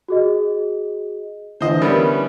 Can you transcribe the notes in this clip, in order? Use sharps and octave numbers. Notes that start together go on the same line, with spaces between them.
F#4 G#4 D#5
D3 E3 C5 D#5 E5
G3 B3 C#4 A#4